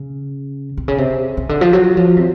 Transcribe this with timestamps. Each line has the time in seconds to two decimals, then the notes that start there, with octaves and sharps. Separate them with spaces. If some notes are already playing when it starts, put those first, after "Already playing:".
Already playing: C#3
0.77 C3
0.88 C#3
0.98 C3
1.37 C#3
1.49 D3
1.61 F3
1.73 F#3
1.97 F3
2.17 C3